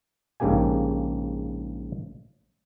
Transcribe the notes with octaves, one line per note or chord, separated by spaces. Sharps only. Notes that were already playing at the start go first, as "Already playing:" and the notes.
A#1 G#2 C#3 A#3 G4 G#5